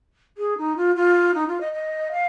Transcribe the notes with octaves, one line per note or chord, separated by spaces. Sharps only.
G#4
D#4
F4
F4
D#4
F4
D#5
D#5
F5